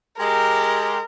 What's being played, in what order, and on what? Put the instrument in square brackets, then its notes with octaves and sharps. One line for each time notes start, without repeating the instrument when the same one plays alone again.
[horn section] G#3 G4 [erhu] A#4